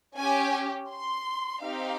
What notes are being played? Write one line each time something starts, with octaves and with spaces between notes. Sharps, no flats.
C#4 G4 G#5
C6
C4 D#4 G4 F5